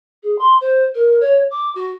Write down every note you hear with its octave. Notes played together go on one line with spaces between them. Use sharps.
G#4
C6
C5
A#4
C#5
D6
F#4